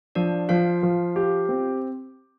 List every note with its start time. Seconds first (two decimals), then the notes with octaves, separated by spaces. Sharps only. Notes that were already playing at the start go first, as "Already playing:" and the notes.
0.15 F3 D4 D5
0.49 F3 F4 F5
0.83 F3
1.16 G4
1.49 C4